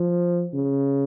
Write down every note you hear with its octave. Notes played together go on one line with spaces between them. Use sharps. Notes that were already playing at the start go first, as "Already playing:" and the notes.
Already playing: F3
C#3